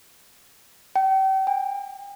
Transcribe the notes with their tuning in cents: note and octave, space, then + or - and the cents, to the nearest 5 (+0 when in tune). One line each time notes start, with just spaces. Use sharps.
G5 -35
G5 +40